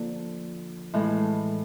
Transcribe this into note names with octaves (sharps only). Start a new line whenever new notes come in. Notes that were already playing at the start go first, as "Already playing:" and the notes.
Already playing: D3 F3 A#3
A2 E3 G#3